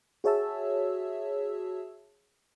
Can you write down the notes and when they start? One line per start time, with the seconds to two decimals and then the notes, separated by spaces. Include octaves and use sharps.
0.24 F#4 G#4 C#5 E5 A5 E6